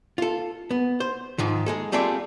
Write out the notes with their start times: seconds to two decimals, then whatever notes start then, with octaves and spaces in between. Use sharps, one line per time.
0.18 F4 A4
0.71 B3
1.00 C5
1.38 G#2 D#3 F3
1.66 G#3 G#4 A4
1.92 G3 A3 C4 F4 G#4 D5